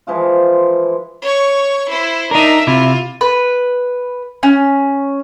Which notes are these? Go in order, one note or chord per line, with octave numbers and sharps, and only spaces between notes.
E3 F3 G#3 F4
C#5 C#6
E4 C5
D4 D#4 A#4 E5
C3 E4 F4
B4
C#4